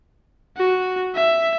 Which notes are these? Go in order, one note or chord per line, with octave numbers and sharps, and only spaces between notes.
F#4
E5